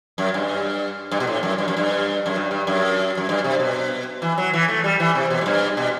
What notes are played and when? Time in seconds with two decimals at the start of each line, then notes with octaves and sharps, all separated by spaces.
0.18 F#2
0.34 G2
1.11 G2
1.20 B2
1.27 A2
1.43 F#2
1.58 G2
1.68 F#2
1.77 G2
2.26 F#2
2.36 G2
2.51 G2
2.67 F#2
3.17 F#2
3.29 G2
3.44 C3
3.60 B2
4.22 E3
4.38 F#3
4.53 E3
4.68 A3
4.84 G3
5.00 E3
5.15 C3
5.30 B2
5.41 A2
5.46 G2
5.77 B2